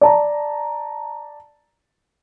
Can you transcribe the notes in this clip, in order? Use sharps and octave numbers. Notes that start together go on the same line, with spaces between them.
D5 A5 A#5